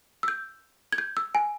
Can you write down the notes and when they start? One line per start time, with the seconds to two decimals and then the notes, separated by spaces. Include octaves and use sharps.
0.23 E6
0.28 G6
0.93 G#6
0.98 G6
1.17 E6
1.35 G#5